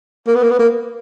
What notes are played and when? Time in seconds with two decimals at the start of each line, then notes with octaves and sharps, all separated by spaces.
0.27 A#3
0.35 B3
0.43 A#3
0.51 B3
0.59 A#3